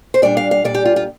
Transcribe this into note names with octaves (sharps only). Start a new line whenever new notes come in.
C5
A#2 G3 D4 D5
F5
F5
A#2 G3 D4 D5
G4
F4
F4